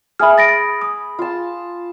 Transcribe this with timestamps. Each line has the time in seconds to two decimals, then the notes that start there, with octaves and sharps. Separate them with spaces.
0.19 G#4 E5 G#5 B5 F6
0.38 A6 A#6 D7
0.82 D#6
1.19 F4 A5